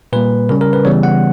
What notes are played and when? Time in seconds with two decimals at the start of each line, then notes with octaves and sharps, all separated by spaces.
0.13 A#2 G3 A#3 B4
0.49 C#3 G3 C#4 A#4
0.61 A#4
0.73 B4
0.85 C#3 E3 G3 B3 C#5
1.03 F#5